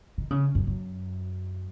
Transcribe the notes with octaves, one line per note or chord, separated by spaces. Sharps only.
D#3
C#3
F#2
F#2